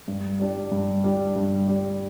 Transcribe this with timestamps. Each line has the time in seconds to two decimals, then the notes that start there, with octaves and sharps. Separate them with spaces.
0.08 G2
0.40 G3 D4
0.72 G2
1.04 G3 D4
1.36 G2
1.68 G3 D4